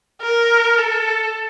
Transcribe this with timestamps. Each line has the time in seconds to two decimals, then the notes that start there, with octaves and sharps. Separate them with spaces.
0.22 A#4
0.78 A4